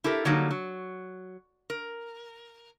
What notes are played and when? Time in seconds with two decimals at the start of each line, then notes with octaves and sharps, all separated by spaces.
0.04 E4 G4 A4 A#4
0.25 D3 F#3 G3 A#3 D#4
0.51 F#3
1.70 A#4